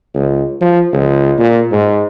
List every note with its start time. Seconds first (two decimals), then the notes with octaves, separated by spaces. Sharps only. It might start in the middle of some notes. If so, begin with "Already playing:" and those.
0.14 C#2
0.61 F3
0.93 C#2
1.39 A#2
1.72 G#2